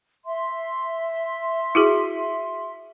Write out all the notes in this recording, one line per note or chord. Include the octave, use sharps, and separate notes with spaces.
E5 C6
E4 F#4 G#4